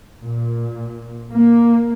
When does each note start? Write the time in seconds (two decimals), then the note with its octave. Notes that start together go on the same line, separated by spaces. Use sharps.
0.23 A#2
1.33 A#3